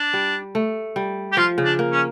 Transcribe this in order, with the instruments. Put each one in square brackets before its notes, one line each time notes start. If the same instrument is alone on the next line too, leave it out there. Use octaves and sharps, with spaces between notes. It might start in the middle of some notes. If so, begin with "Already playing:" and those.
Already playing: [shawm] D4
[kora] G3
A3
G3
[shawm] G4
[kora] F3 [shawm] F4
[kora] C#3
[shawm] D4
[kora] A#3
[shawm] C#4